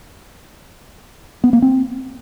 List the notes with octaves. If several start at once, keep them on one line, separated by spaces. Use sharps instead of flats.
B3
A#3
C4